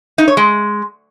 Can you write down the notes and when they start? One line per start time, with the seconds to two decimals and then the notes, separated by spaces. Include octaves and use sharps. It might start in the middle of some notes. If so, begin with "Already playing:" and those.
0.18 D#4
0.28 C#5
0.37 G#3